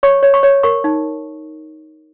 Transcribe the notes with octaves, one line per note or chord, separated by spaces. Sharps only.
C#5 C#6
C#5
C#6
C#5
A#4 C#6
D#4